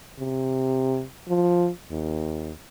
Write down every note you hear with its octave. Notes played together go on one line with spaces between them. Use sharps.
C3
F3
D#2